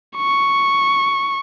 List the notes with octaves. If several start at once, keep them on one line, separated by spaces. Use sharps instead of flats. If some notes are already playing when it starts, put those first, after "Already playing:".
C#6